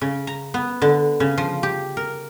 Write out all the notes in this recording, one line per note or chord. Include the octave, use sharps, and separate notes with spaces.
C#3
A#5
B3
D3
C#3
F3
G4
A#4